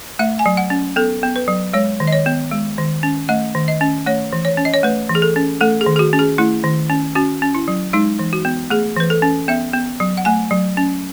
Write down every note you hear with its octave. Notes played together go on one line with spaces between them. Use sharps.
A3 E5
G#5
F#3
F#5
C#4
B3 A4
B3
B4
F#3
G#3 C#5
D#3
D#5
C#5
B3
G#3
D#3
C#4
A3 D#5
D#3
D#5
C#4
A3 C#5
E3
C#5
C#4
D#5
C#5
A3 B4
E3
G#4
A4
C#4
A3 A4
G#4
D#3
G#4
F#4
C#4
G#4
A3 E4
D#3
C#4
C#4 F#4
C#4
E4
F#3
G#3 D#4
E3
F#4
B3
A3 G#4
E3 B4
A4
C#4
B3 E5
B3
F#3
F#5
A3 G#5
F#3
C#4